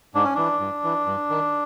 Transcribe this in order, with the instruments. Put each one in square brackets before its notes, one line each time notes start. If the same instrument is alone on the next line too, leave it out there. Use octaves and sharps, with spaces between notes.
[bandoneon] G#2 D4
C#4
E3 D4
G2
E3
G2
D#3